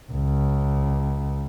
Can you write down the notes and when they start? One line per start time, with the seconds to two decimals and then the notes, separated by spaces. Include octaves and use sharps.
0.11 C#2